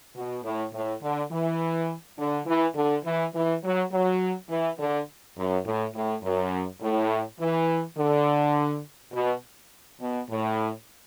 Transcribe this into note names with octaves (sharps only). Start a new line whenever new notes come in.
B2
A2
A2
D3
E3
D3
E3
D3
E3
E3
F#3
F#3
E3
D3
F#2
A2
A2
F#2
A2
E3
D3
B2
B2
A2